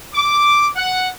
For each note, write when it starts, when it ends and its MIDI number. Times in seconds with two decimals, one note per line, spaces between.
0.13 0.68 86
0.76 1.09 78